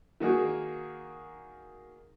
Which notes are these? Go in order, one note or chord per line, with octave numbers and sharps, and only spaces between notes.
D#3 A#3 F#4 G#4